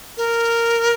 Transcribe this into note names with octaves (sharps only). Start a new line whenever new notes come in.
A#4